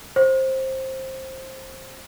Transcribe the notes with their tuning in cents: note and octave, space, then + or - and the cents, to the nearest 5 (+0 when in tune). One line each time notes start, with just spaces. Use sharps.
C5 +15